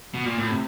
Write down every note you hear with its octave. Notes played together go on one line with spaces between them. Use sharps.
B2
A#2
A2
C3